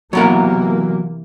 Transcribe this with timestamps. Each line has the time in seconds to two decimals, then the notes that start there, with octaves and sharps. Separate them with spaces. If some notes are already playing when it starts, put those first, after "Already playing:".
0.13 C3 E3 F#3 A#3 B3 A#4